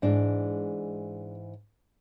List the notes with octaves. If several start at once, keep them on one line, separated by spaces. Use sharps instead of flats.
G#2 E3 G#3 D4